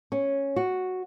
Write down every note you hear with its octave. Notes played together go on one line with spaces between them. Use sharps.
C#4
F#4